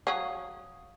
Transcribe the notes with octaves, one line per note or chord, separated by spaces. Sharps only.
F#3 C#4 F5 D#6